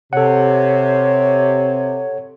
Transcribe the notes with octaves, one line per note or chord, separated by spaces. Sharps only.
C3 C4 A4 C#5 F#5